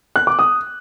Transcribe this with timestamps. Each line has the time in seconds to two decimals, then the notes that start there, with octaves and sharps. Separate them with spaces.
0.16 F#6
0.27 D6
0.39 D#6